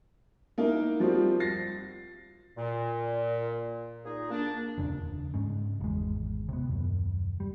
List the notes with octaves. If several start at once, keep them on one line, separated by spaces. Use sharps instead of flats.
A#3 D#4 E4 A#4
F3 G3 C4 F4 F#4
A6 A#6 C7
A#2
A#2 D#4 G#4
A#3 D4
D#1 F2 C#3 D4
G#2 C#3
G#1 E2 G#3
C3 B3
D#1 F#2
G3